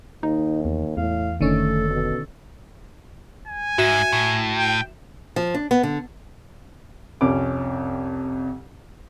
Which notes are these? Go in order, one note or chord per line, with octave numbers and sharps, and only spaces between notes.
D#2 D#4
E2
E2 A2 F5
F1 D3 D#3 A3 C#4 A4
B2
G#5
G#2 F#4 E5 E7
A2
G5
F3
D4
B3
D3
C2 F2 C#4 D6